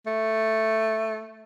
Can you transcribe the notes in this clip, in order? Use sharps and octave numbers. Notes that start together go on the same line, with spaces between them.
A3